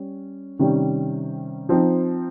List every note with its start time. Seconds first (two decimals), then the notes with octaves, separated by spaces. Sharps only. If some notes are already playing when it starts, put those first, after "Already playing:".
Already playing: G3 C#4
0.59 C3 D#3 G3 C#4
1.69 F3 C4 D#4